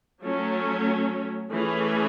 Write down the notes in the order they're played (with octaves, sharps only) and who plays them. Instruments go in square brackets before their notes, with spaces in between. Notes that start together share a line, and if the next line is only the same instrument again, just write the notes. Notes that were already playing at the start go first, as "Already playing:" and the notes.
[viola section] F#3 A3 C#4
E3 A3 C#4 G#4 B4